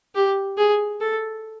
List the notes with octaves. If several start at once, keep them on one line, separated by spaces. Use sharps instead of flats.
G4
G#4
A4